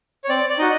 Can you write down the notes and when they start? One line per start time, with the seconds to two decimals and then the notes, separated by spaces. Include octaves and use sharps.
0.24 C#5
0.29 C4 D5
0.49 D5
0.58 D#4 F#4 D#5